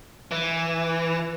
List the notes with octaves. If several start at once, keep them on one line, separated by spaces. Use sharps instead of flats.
E3